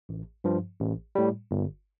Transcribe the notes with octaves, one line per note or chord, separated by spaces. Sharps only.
A1
G2 F3
A1
A2 G3
G1